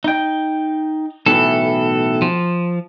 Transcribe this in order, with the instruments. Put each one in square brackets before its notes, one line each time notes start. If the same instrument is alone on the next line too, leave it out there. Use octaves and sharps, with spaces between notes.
[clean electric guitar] D#4 G5
[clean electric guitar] B1 A2 E3 [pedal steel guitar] A4
[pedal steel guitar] F3